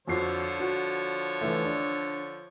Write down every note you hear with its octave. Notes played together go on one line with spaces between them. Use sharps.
F2 D3 F3 F#4 C#5 C7
F#4
E3 A3
D4